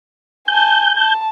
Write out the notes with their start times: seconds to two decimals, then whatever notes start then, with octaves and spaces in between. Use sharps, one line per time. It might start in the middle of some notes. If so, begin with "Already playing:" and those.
0.48 G#5 A5 G6
0.96 A5